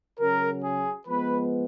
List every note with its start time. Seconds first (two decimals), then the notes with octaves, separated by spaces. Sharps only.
0.19 C#3 F#3 C#4 A#4
0.63 G#4
1.06 F3 G#3 B3 B4